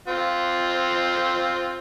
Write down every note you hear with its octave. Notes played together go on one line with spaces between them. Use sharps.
C4 F4